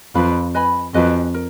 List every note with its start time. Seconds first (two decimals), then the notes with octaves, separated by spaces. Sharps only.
0.15 F2 F4 B4 F5 B5
0.54 B4 D#5 G#5 B5
0.94 F2 F#4 B4 D#5 G#5
1.34 A#4